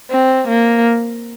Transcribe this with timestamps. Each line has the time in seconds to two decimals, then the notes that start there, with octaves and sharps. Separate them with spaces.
0.11 C4
0.49 A#3